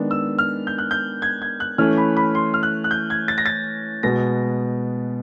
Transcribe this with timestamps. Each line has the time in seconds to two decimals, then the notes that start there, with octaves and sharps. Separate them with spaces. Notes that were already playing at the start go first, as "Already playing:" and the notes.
Already playing: D#3 G#3 B3 D4
0.11 E6
0.39 F6
0.67 G6
0.78 F#6
0.91 G6
1.22 G#6
1.42 G#6
1.60 F#6
1.78 E3 A3 C#4 F6
1.97 B5
2.17 B5
2.35 C6
2.54 F6
2.63 F#6
2.84 F#6
2.91 G6
3.10 G#6
3.28 A6
3.38 A#6
3.46 A6
4.03 B2 G#3 B3 A#6